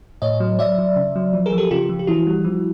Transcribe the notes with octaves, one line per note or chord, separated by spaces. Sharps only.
A2 C#5 D#5
F#3
F#3 D5 E5
F#3
C#3
F#3
F3
G#4 A#4
F3
G4 A4
C#3 F4 G4
F3
G4
E3 E4 F#4
G3
F3